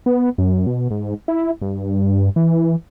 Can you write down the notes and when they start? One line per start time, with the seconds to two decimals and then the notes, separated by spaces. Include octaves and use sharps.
0.06 B3
0.38 F#2
0.67 B2
0.91 G#2
1.28 E4
1.62 G2
2.36 E3